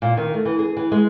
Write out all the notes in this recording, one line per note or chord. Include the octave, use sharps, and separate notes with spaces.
A#2
D#3
A3
E3
G#4
E3
G#3